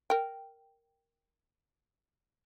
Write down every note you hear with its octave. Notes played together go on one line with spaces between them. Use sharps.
A#4 G5